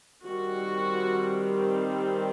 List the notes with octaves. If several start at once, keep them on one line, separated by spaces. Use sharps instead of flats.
D#3 G3 C4 F#4